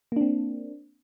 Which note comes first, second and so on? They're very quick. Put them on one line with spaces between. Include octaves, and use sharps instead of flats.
A#3 D4 C4